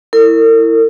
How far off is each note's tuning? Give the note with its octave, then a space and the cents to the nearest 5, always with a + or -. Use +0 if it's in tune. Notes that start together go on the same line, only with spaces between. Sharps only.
E4 +0 A#4 -45